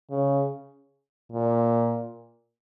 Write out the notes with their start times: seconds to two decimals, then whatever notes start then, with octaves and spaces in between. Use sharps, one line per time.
0.11 C#3
1.32 A#2